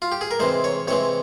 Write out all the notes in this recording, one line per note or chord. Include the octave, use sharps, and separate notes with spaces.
F4
G4
G#4
A#4
C3 E3 G#3 C5
C#5
C3 E3 G#3 C#5